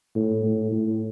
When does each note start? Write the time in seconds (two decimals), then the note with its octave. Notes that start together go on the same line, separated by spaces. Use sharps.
0.15 A2
0.43 A2
0.72 A2